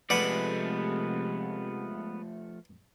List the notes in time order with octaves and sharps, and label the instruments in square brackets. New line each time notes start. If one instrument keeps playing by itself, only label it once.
[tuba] C3 [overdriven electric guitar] F3 A3 [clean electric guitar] G#3 B3 D5 [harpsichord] B4 F#5